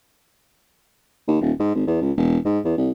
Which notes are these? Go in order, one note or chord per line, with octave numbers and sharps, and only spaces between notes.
D#2
D#1
G#2
G#1
E2
C#2
E1
G#2
E2
C2